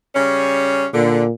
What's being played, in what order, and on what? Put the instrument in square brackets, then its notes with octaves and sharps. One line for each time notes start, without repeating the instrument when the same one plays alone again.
[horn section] C#3 G3 C#4
[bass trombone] A#2 [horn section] D3